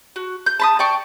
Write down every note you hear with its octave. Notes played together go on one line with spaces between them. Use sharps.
F#4
G6
A5 B5 D#6
D5 G5 C#6